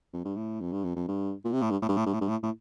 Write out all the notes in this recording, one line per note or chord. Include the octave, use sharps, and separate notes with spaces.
F2
G2
A2
F2
G2
F2
F2
G2
A#2
C3
A2
G2
A2
G2
A2
G2
A2
G2
A2
A2